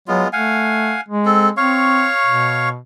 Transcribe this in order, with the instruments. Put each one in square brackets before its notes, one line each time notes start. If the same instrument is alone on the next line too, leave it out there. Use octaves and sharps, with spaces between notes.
[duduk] F#3 [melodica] G#3 B3 F4
[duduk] A3 [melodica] F5 F#5 G#5
[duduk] G#3
[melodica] C4 A4
[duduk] C4 [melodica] C#5 F5 C#6
[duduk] B2